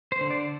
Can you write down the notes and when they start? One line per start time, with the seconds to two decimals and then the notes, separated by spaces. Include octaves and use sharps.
0.12 C5
0.21 D3
0.31 D5